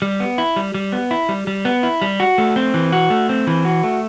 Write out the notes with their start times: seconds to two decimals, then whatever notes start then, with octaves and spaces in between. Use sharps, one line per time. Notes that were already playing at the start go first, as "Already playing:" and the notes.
0.02 G3
0.20 B3
0.38 E4
0.56 G3
0.74 G3
0.92 B3
1.11 E4
1.29 G3
1.47 G3
1.65 B3
1.83 E4
2.02 G3
2.20 F#4
2.38 A3
2.56 C4
2.74 E3
2.92 F#4
3.10 A3
3.29 C4
3.47 E3
3.65 F#4
3.83 A3